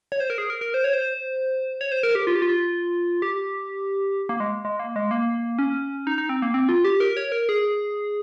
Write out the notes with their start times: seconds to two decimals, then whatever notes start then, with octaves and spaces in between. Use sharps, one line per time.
0.12 C#5
0.20 C5
0.30 A#4
0.38 G#4
0.50 A#4
0.61 A#4
0.74 C5
0.84 C#5
0.93 C5
1.81 C#5
1.92 C5
2.03 A#4
2.15 G4
2.27 F4
2.35 G4
2.42 F4
3.22 G4
4.29 A#3
4.40 G#3
4.65 G#3
4.79 A#3
4.96 G#3
5.11 A#3
5.59 C#4
6.07 D#4
6.18 D#4
6.29 C4
6.42 A#3
6.54 C4
6.69 F4
6.84 G4
7.00 A#4
7.17 C#5
7.32 A#4
7.49 G#4